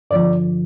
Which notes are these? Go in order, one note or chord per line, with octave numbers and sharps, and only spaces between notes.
G2 D3 F3 D5